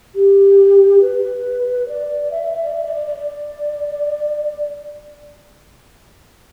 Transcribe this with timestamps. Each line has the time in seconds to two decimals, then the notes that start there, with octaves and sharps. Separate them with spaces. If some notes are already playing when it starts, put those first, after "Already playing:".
0.15 G4
1.02 B4
1.88 D5
2.31 E5
2.43 E5
2.53 E5
2.64 D5
2.75 E5
2.86 D5
2.96 D5
3.07 D5
3.19 D5